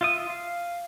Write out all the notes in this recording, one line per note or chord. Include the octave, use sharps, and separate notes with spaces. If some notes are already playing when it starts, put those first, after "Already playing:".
F4 E5 D#6
F5